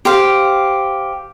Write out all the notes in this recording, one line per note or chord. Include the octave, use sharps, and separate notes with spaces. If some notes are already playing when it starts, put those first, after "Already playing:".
G4 C5 F5